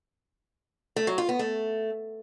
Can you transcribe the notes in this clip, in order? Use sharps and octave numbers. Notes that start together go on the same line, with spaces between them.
A3
F#3
F4
B3
A3